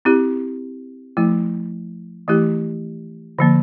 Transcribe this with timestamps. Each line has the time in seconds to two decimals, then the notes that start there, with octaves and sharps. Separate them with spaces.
0.05 C4 E4 G4
1.17 F3 A3 E4
2.28 E3 A3 E4 G4
3.39 D3 F3 A#3